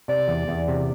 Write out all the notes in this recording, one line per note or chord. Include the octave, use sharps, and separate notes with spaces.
C3 D5
E2
E2
C3